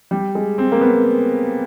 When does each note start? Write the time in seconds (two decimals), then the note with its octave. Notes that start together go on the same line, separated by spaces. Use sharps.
0.11 G3
0.35 G#3
0.58 C4
0.72 A#3
0.81 B3